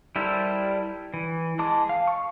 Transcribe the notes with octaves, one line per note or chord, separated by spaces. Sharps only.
G3 E4 A4 A#4 C5
E3
G#3 A5 D6
F5
C#6